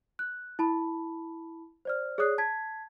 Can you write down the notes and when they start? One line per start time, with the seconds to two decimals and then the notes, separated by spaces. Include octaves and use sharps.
0.19 F#6
0.59 E4 A5 B5
1.85 C5 D5 F6
2.18 G#4 C#5 D5 D#6 F#6 C7
2.38 A5 G#6 B6